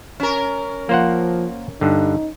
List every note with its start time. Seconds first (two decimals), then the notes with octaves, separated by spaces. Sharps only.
0.20 C#4 A#4
0.89 F3 A#3 C5 F#5
1.81 G2 D3 D#4